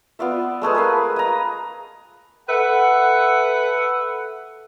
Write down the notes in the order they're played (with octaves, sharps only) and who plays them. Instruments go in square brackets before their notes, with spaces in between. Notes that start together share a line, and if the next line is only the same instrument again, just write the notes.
[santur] B3 F4 D5 E5
G#3 A3 G#4 B4
A#4 B4 F5
D#5 A#5
[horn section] A4 B4 E5 F#5